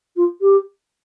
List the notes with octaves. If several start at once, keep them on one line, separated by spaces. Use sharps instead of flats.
F4
G4